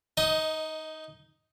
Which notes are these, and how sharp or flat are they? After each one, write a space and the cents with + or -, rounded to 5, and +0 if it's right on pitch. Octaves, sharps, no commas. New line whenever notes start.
D#4 +0 D#5 +20